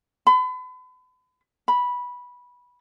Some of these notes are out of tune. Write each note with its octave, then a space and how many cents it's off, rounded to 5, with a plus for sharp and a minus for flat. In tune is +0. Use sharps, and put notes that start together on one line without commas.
B5 +40
B5 -10